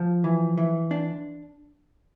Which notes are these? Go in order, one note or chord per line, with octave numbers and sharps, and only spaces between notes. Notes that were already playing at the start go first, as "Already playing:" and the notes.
Already playing: F3
E3
E3
D4